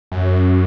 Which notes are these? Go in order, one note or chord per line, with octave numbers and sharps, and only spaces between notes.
F#2